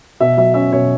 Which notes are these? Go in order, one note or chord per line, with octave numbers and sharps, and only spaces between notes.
B2 E5
F#3 E5
C#4 E5
B2 C#5